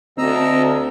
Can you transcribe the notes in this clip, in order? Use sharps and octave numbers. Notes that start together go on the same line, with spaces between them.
D2 C4 D#5 A#5 E6